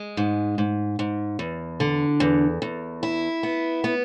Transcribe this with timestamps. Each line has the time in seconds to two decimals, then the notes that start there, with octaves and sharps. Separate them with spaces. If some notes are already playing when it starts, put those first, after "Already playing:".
Already playing: G#3
0.17 G#2
0.58 G#2
0.99 G#2
1.39 E2
1.80 D3
2.20 E2
2.62 E2
3.03 E4
3.43 B3
3.84 B3